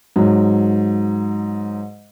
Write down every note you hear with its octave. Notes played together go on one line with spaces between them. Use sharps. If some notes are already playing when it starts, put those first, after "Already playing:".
G#2 F#3